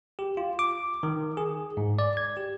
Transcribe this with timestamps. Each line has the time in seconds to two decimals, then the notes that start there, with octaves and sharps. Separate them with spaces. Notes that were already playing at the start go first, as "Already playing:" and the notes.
0.19 G4
0.37 F4
0.59 D6
1.03 D#3
1.37 G#4
1.77 G#2
1.99 D5
2.17 G#6
2.37 G4